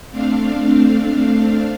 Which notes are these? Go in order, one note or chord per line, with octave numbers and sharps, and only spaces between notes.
A3 C4 D4 F5